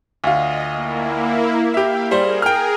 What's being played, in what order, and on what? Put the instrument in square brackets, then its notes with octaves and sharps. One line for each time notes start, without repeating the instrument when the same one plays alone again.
[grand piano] D2 F4 [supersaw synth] D#5
[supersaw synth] A#3 E4
[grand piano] G4 E5 [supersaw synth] F5 G5
[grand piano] G3 C5 [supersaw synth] G#4 A#4
[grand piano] G5 F6